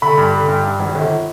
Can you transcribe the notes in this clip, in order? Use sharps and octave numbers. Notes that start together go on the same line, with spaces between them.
D3 B5
G2
D3
G2
G2
G#1
G1